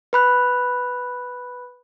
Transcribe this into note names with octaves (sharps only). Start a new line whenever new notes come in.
B4 B5 F#6